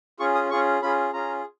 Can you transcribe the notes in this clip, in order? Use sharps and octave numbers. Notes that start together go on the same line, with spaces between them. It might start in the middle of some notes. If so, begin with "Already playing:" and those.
C#4 F4 G#4 C#6
D#6
C#4 F4 G#4 C#6
C#4 F4 G#4 B5
C#4 F4 G#4 A#5